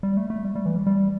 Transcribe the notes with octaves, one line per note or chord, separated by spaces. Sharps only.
G3
A3
A3
G3
G3
E3
G3
G3